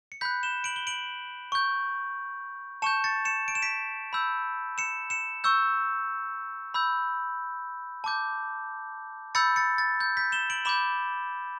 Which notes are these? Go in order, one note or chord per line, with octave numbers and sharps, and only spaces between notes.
C#7
B5 F#6 G6 B6
E7 G7
D7 F#7
G7
D7 F#7
C#6 G6
A5 C#6 G6 C#7 E7
A6 C#7
C#7 E7
D7
E7
B6 D7
B5 E6 G6
C#7 E7
C#7 E7
C#6 E6 G6
B5 E6 G6
A5 D6 G6
B5 E6 G6 A6 C#7
A6 C#7
A6
G6
G6 B6
E7 G7
D7 F#7
B5 D6 G6 E7 G7